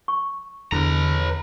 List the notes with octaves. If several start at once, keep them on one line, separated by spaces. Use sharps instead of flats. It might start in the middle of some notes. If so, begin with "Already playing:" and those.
C#6
E2 D3 B4 A#5